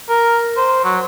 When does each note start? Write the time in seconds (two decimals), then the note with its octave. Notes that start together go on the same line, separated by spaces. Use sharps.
0.09 A#4
0.57 C5
0.84 F#3